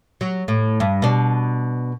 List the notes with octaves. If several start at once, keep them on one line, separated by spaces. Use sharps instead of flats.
F#3
A2
G2
B2 D4